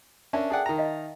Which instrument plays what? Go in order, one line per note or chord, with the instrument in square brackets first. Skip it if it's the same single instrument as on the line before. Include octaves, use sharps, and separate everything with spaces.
[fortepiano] C#4 D4 [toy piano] A#4 E5 A5
[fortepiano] G#4 D5 F#5 [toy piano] G5 A5
[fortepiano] D#3 A#5
[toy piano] D#5 F5